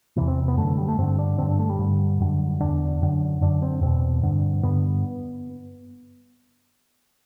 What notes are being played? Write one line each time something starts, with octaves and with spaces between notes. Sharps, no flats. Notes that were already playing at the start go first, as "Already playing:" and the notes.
E2 C3 E3
C4
B3
F#2 D3 A3
A3
G3
A3
G2 D3 C4
D4
G2 D3 C4
D4
A3
G3
G2 D3
F#2 D3
E2 D3 D4
F#2 D3
F#2 D3 D4
C4
E2 B2 C4
G2 D3
G2 D3 B3